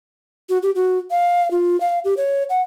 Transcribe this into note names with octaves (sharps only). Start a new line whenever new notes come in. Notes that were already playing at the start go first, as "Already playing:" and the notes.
F#4
G4
F#4
F5
F4
F5
G4
C#5
F#5